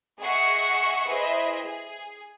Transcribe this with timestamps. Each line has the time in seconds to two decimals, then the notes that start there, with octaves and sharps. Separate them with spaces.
0.21 G#4 D#5 E5 F#5 C#6 C#7
1.08 E4 G#4 B4 C5 D#5 E5
1.62 G#4